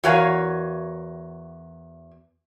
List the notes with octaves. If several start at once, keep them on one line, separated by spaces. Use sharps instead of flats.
E2 F#4 A#4 C#5 F5 G#5